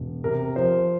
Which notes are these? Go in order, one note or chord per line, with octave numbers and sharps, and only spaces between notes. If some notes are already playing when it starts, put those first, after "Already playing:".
Already playing: E1
C3 A#4
F3 C5